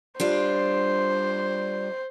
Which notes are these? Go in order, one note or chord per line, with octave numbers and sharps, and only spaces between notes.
G3 D4 F4 C5